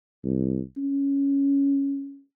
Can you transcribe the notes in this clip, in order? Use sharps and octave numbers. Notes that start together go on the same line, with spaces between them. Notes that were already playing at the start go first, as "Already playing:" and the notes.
C2
C#4